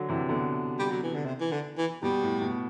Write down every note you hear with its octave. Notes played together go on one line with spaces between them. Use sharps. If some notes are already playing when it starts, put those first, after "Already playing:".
Already playing: D3 F#3
C3 E3
B2 D3
G3
F#3
E3
D3
C3
E3
D3
E3
B2 G3
A2
B2